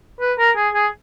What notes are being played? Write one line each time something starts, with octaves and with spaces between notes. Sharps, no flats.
B4
A#4
G#4
G#4